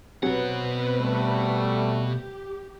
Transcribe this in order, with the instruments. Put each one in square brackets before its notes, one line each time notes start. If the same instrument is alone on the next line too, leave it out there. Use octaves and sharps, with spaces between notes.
[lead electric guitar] B2 F#5 [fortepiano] F#3 [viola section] C4 B4
[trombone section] G3 A3
[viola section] G4